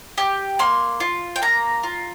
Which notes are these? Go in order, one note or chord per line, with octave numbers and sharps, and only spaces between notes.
G4
A#3 C6
F4
G5
A#3 A#5
F4